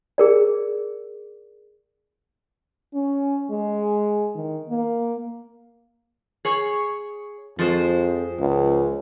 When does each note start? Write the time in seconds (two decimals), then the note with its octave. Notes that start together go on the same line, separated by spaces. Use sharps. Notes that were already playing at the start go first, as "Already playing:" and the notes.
0.18 G#4 A#4 D5
2.93 C#4
3.50 G#3
4.35 D#3
4.69 A#3
6.45 G#4 C#5
7.59 F2 F3 G#3 C5
8.40 C#2